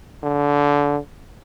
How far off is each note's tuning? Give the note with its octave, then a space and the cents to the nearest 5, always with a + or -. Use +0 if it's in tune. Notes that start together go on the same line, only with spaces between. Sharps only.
D3 -20